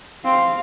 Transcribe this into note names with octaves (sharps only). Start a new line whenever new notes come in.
C4 F5